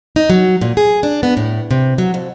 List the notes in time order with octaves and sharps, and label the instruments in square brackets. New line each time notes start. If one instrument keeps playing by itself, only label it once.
[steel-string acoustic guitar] D#4
F#3
A#2
G#4
D4
B3
A2
C3
F#3
F2